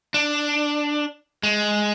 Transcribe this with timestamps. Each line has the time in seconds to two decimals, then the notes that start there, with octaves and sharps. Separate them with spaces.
0.14 D4
1.43 G#3